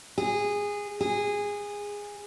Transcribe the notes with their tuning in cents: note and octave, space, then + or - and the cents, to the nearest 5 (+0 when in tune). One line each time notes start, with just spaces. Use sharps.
G#4 -15
G#4 -15